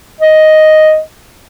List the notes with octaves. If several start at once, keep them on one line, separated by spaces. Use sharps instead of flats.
D#5